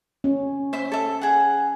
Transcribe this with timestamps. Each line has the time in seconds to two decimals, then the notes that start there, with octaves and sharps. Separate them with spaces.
0.24 C#4
0.73 C5 E5 C6
0.92 A4 E5
1.21 G#4 F#5